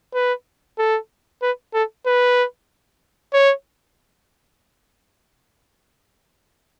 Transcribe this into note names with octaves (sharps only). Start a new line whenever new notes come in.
B4
A4
B4
A4
B4
C#5